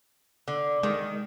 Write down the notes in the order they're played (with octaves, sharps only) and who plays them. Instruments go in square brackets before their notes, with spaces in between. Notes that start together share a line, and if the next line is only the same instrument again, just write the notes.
[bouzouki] D3
[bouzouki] D#3 [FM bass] G#3